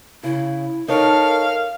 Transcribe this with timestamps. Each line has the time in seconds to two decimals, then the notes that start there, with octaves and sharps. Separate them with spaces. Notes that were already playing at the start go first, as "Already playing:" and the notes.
0.23 C#3 E4
0.88 D#4 A4 A#4 C#5 F5